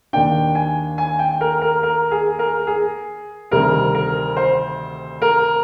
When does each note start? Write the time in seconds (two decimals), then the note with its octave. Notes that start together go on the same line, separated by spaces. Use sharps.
0.13 D#2 D#3 A#3 D4 G5
0.55 G#5
0.98 G#5
1.19 G5
1.41 A#4
1.61 A#4
1.83 A#4
2.11 G#4
2.39 A#4
2.67 G#4
3.51 D2 C3 D#3 G3 C4 A#4
3.95 A#4
4.37 C5
5.22 A#4